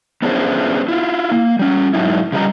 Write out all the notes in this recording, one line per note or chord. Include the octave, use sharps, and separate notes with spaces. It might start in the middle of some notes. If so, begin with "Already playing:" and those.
B3 C#4 D4 E4 G#4 C5
E4 F4
A#3
G3 C#4
G#2 F#3 D#4 E4
C#3 F3 G3 D4 D#5 A#5